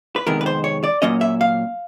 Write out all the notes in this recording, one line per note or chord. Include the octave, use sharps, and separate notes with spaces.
B4
F2 C3 D#3 G#3 B3 A#4
B4
C5
C#5
D5
A#2 F#3 A#3 C#4 D#5
E5
F5